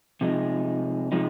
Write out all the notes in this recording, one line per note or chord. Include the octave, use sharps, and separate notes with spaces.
C3 F3 G#3 D#4
C3 F3 G#3 D#4